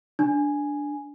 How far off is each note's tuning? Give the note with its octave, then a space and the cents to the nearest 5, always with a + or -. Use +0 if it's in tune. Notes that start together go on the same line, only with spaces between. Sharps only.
D4 -5 G#5 +0